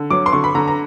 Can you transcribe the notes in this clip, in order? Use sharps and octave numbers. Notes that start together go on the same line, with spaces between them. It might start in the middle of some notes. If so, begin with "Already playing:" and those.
Already playing: D3
F#3 D6
C6
D3 C#6
B5
D3 A#5
A#5